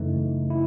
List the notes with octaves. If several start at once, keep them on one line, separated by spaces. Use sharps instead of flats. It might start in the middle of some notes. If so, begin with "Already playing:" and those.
Already playing: F#2 C#3 E3 A3 D#4
E4